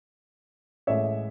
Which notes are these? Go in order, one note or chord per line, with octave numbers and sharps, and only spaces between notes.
A1 A2 G#3 C#5 E5